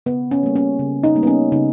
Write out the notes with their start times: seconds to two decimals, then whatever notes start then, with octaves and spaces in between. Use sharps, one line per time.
0.06 C#3 B3
0.31 C#4
0.43 G3 A#3
0.56 C#4
0.79 C#3
1.04 D#4
1.15 G3 A#3
1.23 B3
1.27 C#4
1.52 C#3 D#4